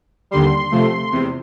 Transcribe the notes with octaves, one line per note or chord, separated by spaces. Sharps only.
D#2 D3 G3 C6
C3 F3 A3
E2 C3